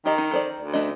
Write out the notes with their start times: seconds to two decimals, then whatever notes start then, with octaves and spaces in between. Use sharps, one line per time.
0.06 D#3 G4 D#5
0.18 D#4
0.31 A4 C5 D5
0.60 D2
0.73 A3 D4 D#5